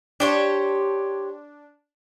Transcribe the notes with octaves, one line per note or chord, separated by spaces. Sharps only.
D4 G4 C5 C#5